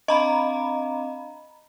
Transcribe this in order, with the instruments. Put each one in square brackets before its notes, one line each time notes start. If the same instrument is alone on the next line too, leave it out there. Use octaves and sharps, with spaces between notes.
[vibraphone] C4 D4 F5 [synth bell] D#5 A#5 B5